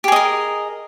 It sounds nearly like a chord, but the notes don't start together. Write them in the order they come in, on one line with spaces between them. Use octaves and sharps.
G4 G#4 D#5 A#4